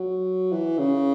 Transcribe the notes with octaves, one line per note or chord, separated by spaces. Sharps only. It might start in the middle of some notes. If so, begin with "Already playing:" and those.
Already playing: F#3
E3
C#3